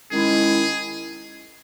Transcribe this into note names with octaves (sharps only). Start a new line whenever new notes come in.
D#3 G#3 C#4 E4 G#4